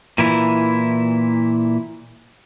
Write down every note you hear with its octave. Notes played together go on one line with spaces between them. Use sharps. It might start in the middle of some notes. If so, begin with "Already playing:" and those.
A#2 E3 E4